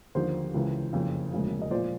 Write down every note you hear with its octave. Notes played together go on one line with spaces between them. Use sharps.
D#2 D3 F3 C5
C#2 C#3 E3
F#1 F2 C#3
E1 D2 C#3 F3
D#5
A#1 A#2 F3 C5 D5